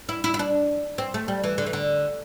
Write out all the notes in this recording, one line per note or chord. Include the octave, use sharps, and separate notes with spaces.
E4
E4
E4
D4
C4
A3
G3
E3
D3
E3
D3